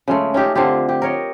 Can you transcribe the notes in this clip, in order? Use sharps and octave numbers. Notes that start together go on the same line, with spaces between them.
C#3 G#3 A3
C#4 D#4 G4
D3 C4 F4 G4
G4
A#4 C#5 D#5